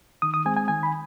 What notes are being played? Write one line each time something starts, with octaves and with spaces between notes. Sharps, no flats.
D#3 D#6
D#6
G#3 C4 G#5
G#5
D#3 G#5
B5